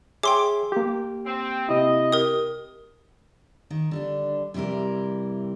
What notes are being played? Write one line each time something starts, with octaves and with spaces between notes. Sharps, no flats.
G#4 C#5 E5 G5 C6 D6
A#3 G4
C4
C3 E4 D#5
G4 A#4 D#6
D#3
D3 G3 D4
C3 E3 G3 E4 A#4